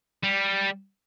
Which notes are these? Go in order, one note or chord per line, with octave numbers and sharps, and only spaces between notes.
G3